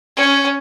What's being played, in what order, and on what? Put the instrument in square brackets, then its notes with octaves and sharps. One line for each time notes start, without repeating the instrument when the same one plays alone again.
[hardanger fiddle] C#4